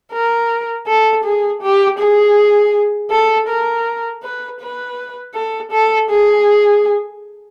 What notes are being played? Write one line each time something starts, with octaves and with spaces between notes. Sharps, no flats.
A#4
A4
G#4
G4
G#4
A4
A#4
B4
B4
A4
A4
G#4